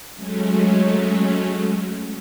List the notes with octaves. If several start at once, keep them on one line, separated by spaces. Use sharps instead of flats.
F#3 G#3 A3 C#4